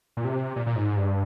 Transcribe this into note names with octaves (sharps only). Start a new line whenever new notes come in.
A#2
C3
A#2
A#2
G#2
G2